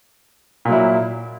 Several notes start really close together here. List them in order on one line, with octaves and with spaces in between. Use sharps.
A#2 F#3 E4